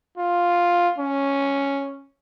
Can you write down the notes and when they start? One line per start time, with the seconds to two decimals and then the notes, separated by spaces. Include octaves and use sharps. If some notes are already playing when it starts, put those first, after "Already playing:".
0.18 F4
0.99 C#4